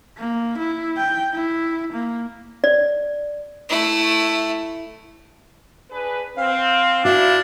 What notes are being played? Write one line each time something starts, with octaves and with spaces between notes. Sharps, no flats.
A#3
E4
G5
E4
A#3
D5
A3 E4
D4 G#4 B4
C4 F5
A#2 D4 E4 F#4 E5